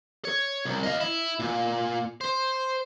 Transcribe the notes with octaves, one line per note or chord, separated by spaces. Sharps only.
C#5
C2
D#5 F5
E4
A#2
C5